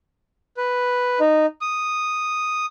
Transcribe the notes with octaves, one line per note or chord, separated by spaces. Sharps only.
B4
D#4
D#6